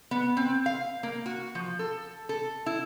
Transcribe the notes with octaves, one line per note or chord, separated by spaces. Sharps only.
B3
C4
F5
A#3
F#4
F3
A4
A4
E4